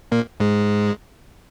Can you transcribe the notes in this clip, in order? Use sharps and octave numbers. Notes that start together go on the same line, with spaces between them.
A#2 A#3
G#2 G#3